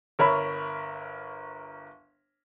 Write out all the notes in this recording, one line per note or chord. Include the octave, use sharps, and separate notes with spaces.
G1 A#4 C#5 E5 B5